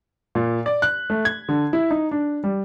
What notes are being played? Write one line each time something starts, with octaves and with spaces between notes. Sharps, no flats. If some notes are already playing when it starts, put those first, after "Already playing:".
A#2
D5
F#6
A3
G#6
D3
E4
D#4
D4
G3